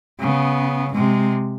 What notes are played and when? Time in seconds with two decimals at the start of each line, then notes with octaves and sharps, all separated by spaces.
0.20 C#3 B3
0.93 C3 G#3